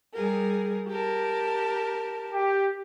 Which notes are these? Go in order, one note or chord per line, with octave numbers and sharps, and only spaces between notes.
G3 G#4 A#4
G4 A#4 A5
G4